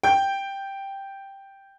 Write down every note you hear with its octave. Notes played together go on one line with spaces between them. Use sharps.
G5 G6